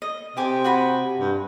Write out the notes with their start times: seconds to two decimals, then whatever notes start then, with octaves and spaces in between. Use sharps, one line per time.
0.02 D#5
0.37 C3 G4 G#5 D6
0.64 F#4 G#5 B5
1.20 G2